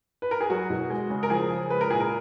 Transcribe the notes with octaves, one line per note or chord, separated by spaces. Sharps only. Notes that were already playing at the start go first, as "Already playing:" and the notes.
B4
A#4
G#4
F#3 F#4
B2
G#3
C#3
A#4
F3 G#4
C#3
G#3 B4
A#4
A#2 G#4
A#4